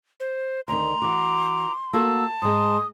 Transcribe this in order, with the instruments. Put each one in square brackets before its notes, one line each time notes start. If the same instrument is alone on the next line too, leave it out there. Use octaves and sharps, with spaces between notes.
[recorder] C5
[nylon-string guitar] D2 D#3 [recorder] A#5 [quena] C6
[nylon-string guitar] E3 F#4 [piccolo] D6
[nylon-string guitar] A#3 F#4 A4 [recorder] A5 [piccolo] E6
[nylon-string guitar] G#2 G#3 [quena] C6 [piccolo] D#6